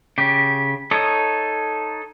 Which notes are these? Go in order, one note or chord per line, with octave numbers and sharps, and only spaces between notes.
C#3 G4
D#4 A4 C#5 D#6